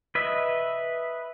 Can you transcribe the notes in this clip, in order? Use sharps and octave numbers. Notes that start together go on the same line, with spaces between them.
B4 D#5 E5